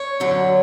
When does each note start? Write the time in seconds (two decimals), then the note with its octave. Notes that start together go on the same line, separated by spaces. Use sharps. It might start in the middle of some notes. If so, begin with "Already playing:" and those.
Already playing: C#5
0.20 F#2 D3 F#3